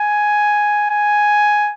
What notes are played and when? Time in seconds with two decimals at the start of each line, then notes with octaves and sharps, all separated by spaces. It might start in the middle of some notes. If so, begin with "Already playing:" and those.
Already playing: G#5
0.90 G#5